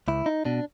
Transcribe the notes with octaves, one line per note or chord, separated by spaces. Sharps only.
C#2 E4
D#4
B2 D4